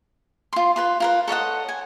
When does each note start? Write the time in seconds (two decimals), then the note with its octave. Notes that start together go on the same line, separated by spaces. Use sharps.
0.53 F4 C6
0.76 F4 B4 C6
1.00 F4 A#4 B4
1.28 A4 C#5 D#5 F#5
1.69 G#5